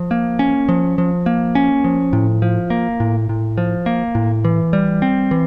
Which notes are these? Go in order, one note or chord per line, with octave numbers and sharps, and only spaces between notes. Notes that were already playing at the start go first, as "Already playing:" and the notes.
Already playing: F3
A#3
C#4
F3
F3
A#3
C#4
F3
A2
F3
A#3
A2
A2
F3
A#3
A2
E3
G3
C4
E3